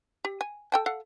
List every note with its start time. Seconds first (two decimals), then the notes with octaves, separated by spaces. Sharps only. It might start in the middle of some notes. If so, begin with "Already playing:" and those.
0.25 G4
0.41 G#5
0.72 A4 G5 A5
0.86 A4 F5 F#5